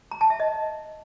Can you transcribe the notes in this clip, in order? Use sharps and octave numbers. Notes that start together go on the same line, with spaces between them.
A#5
A5
E5
D#5